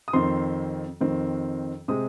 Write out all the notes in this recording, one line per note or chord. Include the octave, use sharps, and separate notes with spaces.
D#6
F2 D#3 C4 C6
F2 D#3 C4
C3 G#3 C4 D#6